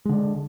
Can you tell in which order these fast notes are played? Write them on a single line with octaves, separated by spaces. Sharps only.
G#3 D3 D4